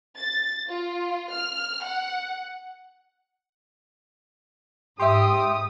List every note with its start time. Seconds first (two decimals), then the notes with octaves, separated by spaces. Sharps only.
0.17 A6
0.69 F4
1.31 F6
1.83 F#5
5.00 G#2 G4 E5 C6 D#6